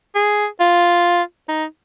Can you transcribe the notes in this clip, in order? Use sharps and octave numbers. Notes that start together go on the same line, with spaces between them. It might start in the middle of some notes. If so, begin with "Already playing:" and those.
G#4
F4
D#4